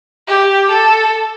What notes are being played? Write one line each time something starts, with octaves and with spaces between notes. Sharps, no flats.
G4
A4